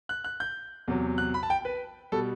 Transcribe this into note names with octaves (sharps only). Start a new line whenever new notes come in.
F#6
F#6
G6
E2 C3 F#3
F#6
B5
A5
G5
B4
B2 G3 A4